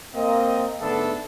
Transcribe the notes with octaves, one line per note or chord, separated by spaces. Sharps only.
A#3 C4 D#5
G#2 D3 A3 B3 D4 A4